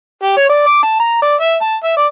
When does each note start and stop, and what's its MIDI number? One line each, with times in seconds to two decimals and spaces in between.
0.23 0.35 67
0.37 0.47 73
0.50 0.65 74
0.67 0.83 86
0.83 0.95 81
1.00 1.20 82
1.22 1.34 74
1.41 1.55 76
1.61 1.76 81
1.84 1.97 76
1.98 2.06 74